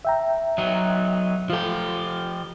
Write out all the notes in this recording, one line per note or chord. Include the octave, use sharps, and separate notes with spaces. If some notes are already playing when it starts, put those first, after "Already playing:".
E5 G5 A#5
F#3 D#4
F3 F4 G4 A4